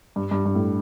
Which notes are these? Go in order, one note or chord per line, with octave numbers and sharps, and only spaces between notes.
G2
G2
G2
A2